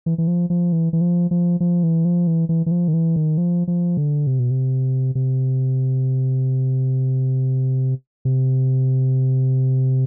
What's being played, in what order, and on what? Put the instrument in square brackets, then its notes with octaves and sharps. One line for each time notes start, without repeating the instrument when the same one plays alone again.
[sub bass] E3
E3
F3
F3
E3
E3
F3
F3
F3
E3
F3
E3
E3
E3
F3
D#3
E3
D#3
F3
F3
D3
C3
B2
C3
C3
C3